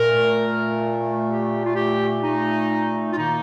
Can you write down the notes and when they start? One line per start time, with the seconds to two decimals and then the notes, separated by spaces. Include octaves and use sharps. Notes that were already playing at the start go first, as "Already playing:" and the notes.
Already playing: A#2 A3 A#4
1.28 G4
1.64 F4
1.75 G4
2.22 D#4
3.12 F4
3.17 D#3 A#3 D#4